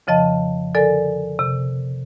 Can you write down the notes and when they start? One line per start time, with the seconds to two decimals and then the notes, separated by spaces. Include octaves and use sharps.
0.07 F2 C#3 F3 D#5 A5
0.75 D3 A4 A#4 D5 G#5
1.39 C3